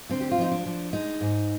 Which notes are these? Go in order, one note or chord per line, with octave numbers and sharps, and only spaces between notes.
D3 C4
G4
F4
F3 D#4
D4
F3
G#3 D#4
G#2